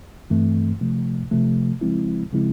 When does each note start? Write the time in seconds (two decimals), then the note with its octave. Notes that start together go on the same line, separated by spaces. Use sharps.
0.30 G2 E3 A3 C4
0.81 C3 F3 A3
1.31 C3 F3 A3
1.81 C#3 F3 G#3 C4 E4
2.32 C#3 F3 G#3 C4 E4